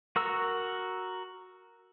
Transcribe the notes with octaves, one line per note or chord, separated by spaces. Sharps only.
F#4 A#4 E6